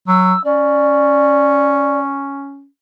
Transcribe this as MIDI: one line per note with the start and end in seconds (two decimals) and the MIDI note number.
0.08 0.34 54
0.08 0.42 88
0.44 2.67 61
0.44 1.99 74